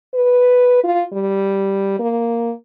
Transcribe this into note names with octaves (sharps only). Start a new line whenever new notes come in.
B4
F4
G3
A#3